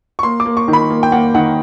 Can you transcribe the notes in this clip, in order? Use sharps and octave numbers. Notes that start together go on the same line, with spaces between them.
C#6
A#3 C6
D6
A#3
C#6
D#3
B5
A#3
G5
A#3 F#5
D#3 F#5